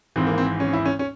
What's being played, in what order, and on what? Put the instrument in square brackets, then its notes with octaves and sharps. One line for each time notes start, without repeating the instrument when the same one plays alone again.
[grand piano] G#1 G#2 E3 C4
A#3
C4
C#4
E4
C#4
C#4